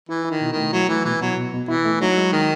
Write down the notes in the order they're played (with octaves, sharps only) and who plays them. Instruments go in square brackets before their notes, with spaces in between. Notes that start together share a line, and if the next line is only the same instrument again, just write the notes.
[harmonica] E3 [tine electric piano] E4
[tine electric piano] E4
[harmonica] D#3
[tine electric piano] B2
[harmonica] D#3 [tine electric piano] A3
[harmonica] F#3 [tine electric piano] E4
[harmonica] E3 [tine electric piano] A3
[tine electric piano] B2 [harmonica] E3
[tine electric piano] B2 [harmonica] F#3
[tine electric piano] B2
B2
[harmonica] E3 [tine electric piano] E4
[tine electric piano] A3
[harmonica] F#3 [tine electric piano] D#4
[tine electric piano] G#3
[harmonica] D#3 [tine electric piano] G#3